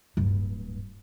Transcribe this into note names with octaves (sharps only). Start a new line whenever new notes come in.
D1 G2